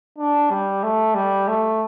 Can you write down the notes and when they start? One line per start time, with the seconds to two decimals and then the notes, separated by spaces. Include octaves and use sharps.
0.18 D4
0.50 G3
0.83 A3
1.15 G3
1.48 A3